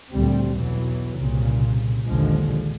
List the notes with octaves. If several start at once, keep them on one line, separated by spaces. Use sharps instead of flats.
D2 A#2 G3 C4
B1 E2 E3 F#3
C2 A#2 C#3
A#1 D#2 D3 F3 G#3